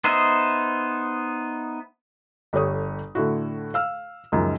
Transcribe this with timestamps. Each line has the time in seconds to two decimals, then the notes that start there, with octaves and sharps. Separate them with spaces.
0.04 B3 D#4 C5 D#5 E5
2.53 G1 G4 A4 C#5 D#6
3.15 A2 D3 E4 F#4
3.74 F5 E6 F6
4.32 C#2 F#2 D#3 F3